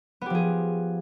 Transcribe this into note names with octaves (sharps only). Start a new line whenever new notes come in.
F3 B3 G4 G#4